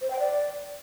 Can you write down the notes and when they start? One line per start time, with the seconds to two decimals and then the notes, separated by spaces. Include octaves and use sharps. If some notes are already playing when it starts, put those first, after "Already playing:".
0.02 C5
0.11 G5
0.20 D5